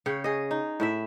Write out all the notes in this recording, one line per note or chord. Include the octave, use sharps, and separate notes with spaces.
C#3 C#5 G5
G#4 D#5
D#4
A2 E4 E5